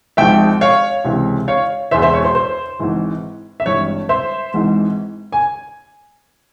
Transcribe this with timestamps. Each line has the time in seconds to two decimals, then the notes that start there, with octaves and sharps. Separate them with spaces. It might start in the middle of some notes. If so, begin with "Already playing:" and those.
0.17 G#1 G#2 F3 E5 G5
0.61 C#5 F5
1.04 C#2 C3 E3
1.48 C#5 F5
1.91 E1 E2 E3 C5 E5
2.02 C5 E5
2.14 C#5
2.24 C5
2.35 C5
2.80 G#1 G#2 E3
3.60 E5
3.66 G#1 G2 E3 C#5
4.09 C5 E5
4.54 G#1 G#2 E3
5.32 G#5